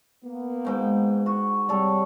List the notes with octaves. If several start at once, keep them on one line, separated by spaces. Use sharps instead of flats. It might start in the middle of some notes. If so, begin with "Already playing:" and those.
A#3 B3
G#2 G5
F#4
C3 G3 A4 C#5 D5